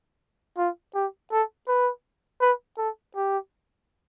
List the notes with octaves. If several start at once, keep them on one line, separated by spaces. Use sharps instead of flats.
F4
G4
A4
B4
B4
A4
G4